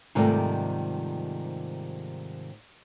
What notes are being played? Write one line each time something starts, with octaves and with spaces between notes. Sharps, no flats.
G#2 C3 D#3 F3 G3 A3